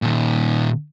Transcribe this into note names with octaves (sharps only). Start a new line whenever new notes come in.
A#2 D#3